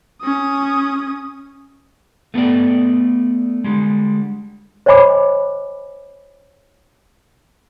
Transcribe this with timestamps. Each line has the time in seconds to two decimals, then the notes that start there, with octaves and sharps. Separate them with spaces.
0.22 C#4 D#6
2.34 A3 B3 A4 D5
3.64 D3 G3 G#3
4.86 C5 C#5 D#5 G#5 B5 D6